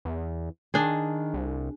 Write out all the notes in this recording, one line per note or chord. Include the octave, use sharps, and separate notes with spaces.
E2
D#3 D4 G#4
C2